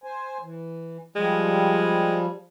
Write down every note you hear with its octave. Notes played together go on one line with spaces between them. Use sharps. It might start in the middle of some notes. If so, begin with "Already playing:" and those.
C5 G#5
E3
F3 G3 G#3